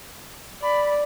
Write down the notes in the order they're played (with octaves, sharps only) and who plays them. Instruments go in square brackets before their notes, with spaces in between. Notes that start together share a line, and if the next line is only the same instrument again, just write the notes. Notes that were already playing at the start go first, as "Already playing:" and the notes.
[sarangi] D5 [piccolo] B5